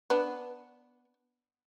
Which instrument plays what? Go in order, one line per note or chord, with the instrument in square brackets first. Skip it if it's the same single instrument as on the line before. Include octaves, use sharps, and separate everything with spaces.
[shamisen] B3 D4